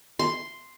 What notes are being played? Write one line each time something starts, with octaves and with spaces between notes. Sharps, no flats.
C6